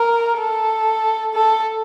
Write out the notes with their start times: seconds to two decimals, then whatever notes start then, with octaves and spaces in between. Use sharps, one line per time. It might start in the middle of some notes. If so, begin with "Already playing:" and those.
Already playing: A#4
0.38 A4
1.33 A4